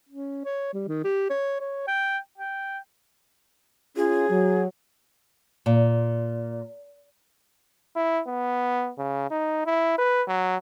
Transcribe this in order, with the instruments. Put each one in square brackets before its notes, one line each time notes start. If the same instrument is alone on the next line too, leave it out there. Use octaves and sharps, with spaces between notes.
[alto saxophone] C#4
C#5
G3
D#3
G4
C#5
C#5
G5
G5
[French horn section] C#4 F4 [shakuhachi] G#4
[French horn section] F#3
[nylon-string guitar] A#2
[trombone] E4
B3
C#3
D#4
E4
B4
F#3